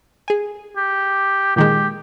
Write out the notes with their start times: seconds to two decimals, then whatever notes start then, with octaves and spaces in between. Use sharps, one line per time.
0.28 G#4 G#5
0.76 G4
1.56 A#2 D#3 G#3 G4